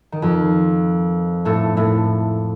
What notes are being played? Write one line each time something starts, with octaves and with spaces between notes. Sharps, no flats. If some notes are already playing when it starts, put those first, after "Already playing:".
D#3
F2 F3
A2 A3
A2 A3